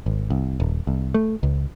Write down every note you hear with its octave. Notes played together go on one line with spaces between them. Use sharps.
G#1
C2
D#1
C2
A3
C#2